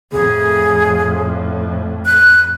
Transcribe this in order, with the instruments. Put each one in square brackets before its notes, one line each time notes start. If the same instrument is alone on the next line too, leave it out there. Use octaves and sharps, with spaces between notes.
[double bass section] F2 A2 [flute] G#4
[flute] F#6